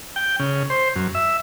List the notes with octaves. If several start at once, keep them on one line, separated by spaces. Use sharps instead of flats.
G5
C#3
C5
F#2
E5